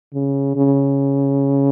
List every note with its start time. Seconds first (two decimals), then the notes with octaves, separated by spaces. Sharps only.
0.14 C#3
0.56 C#3